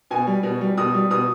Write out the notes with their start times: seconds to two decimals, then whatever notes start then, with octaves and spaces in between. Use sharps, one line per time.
0.11 B2 G#5
0.27 G3
0.43 B2
0.61 G3
0.78 B2 D#6
0.94 G3
1.10 B2 D#6